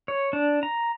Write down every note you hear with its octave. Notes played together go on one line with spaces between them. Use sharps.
C#5
D4
A#5